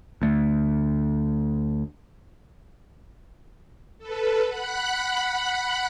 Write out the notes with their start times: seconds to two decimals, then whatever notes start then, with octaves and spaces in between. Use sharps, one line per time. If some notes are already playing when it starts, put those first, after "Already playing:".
0.22 D2 A3
3.98 A4 B4
4.47 F#5 B5 F#6